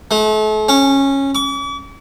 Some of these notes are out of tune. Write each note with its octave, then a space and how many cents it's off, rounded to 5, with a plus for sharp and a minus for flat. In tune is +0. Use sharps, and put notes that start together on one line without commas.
A3 -40
C#4 -15
D6 -45